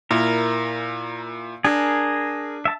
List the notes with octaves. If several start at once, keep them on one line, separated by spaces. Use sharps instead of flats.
A#2 E4 A#4
D4 G#4 A#4
E5 A5